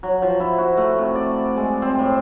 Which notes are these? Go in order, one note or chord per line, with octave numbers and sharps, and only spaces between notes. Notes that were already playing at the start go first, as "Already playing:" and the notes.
F#3
F3
E4
F#4
A3
C3
D5
G#3
C4
A2